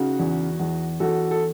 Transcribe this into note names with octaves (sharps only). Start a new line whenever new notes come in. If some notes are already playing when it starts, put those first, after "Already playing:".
Already playing: C#3 D#4 F#4
E2
E2
E2 F#4 A4
A4